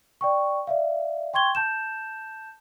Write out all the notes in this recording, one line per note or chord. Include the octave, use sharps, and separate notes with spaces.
D5 G5 C#6
D5 E5 F5
G5 C6 C#6 G#6 G7
A5 G6 E7